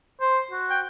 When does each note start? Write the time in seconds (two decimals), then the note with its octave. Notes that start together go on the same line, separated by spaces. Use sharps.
0.21 C5
0.51 F#4
0.70 G5